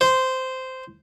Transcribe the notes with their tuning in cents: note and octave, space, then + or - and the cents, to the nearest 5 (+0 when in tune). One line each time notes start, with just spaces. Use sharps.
C5 -10